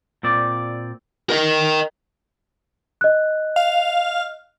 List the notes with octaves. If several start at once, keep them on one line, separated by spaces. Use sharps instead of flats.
A#2 C4 D5
A#4 D#5
D#5 F#6
F5